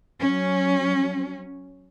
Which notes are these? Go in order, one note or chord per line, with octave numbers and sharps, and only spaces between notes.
F#3 C#4